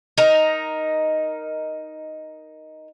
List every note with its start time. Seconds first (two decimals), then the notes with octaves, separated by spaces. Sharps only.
0.18 D#4 A#4